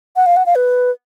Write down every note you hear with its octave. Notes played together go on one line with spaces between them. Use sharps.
F#5
F5
F#5
F5
B4